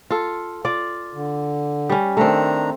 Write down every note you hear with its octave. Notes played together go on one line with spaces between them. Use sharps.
F4 A4
F4 D5
D3
G3 C#4
D#3 A3 C4 D4 A#5